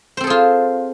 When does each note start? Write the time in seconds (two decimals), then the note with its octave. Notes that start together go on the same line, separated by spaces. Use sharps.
0.17 C5
0.20 C4
0.24 A4
0.27 G#4
0.30 F4